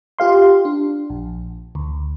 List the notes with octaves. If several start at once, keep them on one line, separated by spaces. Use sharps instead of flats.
F4 G4 F5 C6
D4
A#1
D2